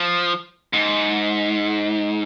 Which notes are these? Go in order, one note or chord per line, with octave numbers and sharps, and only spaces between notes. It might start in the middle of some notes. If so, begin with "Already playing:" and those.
Already playing: F3
G#2